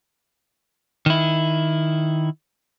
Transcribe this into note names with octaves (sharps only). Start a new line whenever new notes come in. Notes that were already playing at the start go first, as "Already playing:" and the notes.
D#3 E4